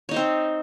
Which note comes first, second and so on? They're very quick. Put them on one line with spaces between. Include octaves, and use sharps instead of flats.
C#5 D#4 C5 C4